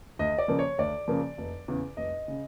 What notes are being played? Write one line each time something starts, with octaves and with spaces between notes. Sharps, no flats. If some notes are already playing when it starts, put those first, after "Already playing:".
D2 D#5
D5
C#3 F3 A#3
C#5
D2 D5
C#3 F3 A#3
F1
E2 C#3
F1 D#5
C#3